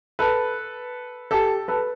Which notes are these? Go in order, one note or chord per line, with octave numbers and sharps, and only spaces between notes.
A4 B4
G4 A4
A4 B4